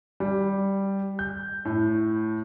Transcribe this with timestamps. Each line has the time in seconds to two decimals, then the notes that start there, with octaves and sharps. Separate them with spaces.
0.20 G3
1.19 G6
1.65 A2